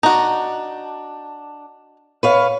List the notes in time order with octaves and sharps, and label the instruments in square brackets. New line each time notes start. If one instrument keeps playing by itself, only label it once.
[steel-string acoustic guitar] D4 [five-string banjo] D#4 F#4
[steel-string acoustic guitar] B4 C#5 F5